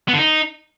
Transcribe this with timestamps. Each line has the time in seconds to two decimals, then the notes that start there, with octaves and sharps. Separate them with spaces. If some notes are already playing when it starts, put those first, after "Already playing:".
0.08 B3
0.13 D3
0.18 D#4